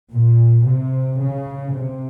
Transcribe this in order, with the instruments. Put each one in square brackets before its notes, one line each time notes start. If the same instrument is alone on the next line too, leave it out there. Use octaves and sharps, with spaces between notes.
[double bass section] A#2
C3
C#3
C3